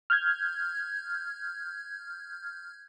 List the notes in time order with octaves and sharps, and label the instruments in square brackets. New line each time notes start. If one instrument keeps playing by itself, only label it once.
[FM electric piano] F6 G6 G#6